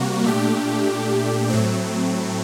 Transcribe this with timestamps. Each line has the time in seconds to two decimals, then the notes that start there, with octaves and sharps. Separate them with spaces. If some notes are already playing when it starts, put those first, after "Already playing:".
Already playing: C3 G3 A#3 F#4
0.24 A#2 A3 D4 G4
1.50 A2 F#3 A3 C4